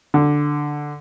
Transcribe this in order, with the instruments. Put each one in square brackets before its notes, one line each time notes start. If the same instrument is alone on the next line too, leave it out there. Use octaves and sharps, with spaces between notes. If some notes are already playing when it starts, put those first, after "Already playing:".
[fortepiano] D3